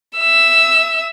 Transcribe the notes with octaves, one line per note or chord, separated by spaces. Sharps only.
E5 E6